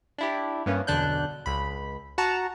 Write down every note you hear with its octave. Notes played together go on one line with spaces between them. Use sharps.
D4 E4 G4
G2 A#3 B3 C#4
B1 E2 D3 D4 F#6 G6
C#2 B5
F#4 F#5 A5 A#5